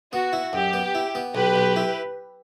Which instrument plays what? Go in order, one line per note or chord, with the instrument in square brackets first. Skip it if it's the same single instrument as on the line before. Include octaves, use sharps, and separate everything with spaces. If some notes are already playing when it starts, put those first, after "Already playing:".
[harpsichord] B3 [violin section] F#4
[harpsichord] E4
[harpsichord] F#2 [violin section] G4
[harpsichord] B3
E4
B3
[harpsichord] B1 [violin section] G4 B4
[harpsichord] B1
E4